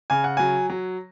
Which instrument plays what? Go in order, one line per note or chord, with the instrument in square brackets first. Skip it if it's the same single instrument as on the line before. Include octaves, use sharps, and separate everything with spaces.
[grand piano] C#3 G#5
F#5
F#3 G#5
F#3